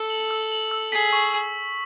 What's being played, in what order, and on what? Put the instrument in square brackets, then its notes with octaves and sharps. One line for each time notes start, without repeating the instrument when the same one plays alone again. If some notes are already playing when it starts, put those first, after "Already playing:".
Already playing: [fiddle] A4 [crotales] E6
[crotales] F#7
E6
F#7
E6
[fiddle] G#4 [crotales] B6
[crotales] C#6
E6